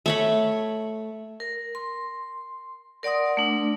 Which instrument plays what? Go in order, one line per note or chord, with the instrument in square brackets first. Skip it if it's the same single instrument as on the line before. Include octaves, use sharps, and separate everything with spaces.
[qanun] A3 C#5 B5
[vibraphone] A#4
C6
A#4 D5 F#5 C6 D#6
A3 D4